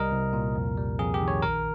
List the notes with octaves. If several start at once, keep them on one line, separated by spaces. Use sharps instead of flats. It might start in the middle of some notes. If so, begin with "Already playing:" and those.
Already playing: C2 G3 A#4 D#5
C2
A#2
F2
G3
F2 G#4
G4
D#3
C#5
A#1 A#4